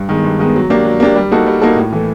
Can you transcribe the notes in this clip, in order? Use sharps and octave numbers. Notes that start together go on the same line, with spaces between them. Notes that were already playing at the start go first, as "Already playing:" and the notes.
Already playing: G2
D#3 G#3 B3
G2
D#3 G#3 B3
F#3
A#3 D4 G4
F#3
A#3 D4 G4
G3
A#3 D#4 F#4 A4
G3
A#3 D#4 F#4 A4
A2
E3 A3